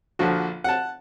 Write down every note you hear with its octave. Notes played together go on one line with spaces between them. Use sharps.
A#1 D3 F3 F#4
F#5 A5